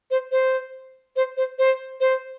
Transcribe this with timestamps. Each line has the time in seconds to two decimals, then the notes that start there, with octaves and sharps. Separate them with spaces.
0.11 C5
0.32 C5
1.16 C5
1.37 C5
1.59 C5
2.00 C5